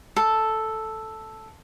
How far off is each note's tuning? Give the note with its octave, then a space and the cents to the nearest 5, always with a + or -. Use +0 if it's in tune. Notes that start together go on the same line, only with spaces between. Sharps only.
A4 +0